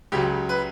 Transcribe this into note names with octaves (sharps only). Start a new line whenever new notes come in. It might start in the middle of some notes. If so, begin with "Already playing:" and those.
C#2 C#3 F#3 G4
B4